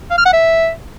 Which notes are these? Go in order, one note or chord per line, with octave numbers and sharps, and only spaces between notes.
F5
F6
F#5
E5